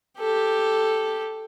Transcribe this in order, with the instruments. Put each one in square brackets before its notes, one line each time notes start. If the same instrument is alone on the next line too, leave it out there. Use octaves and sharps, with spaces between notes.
[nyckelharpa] G4 A4